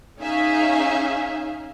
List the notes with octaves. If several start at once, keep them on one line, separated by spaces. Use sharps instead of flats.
C#4 D#4 G#4 E5 F5